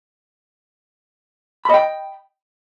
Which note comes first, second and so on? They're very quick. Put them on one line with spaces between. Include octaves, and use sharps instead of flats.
B5 D#5 G5